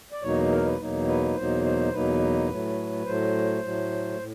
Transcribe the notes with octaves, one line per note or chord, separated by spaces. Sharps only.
D5
E2 B2 F#3 A#3 D#4 C#5
A#4
B4
E2 B2 F#3 A#3 D#4
B4
E2 B2 F#3 A#3 D#4 C5
C5
E2 B2 F#3 A#3 D#4 B4
A2 F#3 A3
A2 F#3 A3 C5
A2 F#3 A3
A2